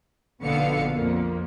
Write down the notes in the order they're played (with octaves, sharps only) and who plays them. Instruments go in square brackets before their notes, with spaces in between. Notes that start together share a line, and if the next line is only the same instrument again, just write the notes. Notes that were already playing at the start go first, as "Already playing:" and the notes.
[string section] A#1 B2 D3 B3 F5 C#7
F2 A#3